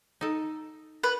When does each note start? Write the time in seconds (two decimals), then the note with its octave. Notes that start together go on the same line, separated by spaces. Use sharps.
0.21 D#4 A4
1.03 B4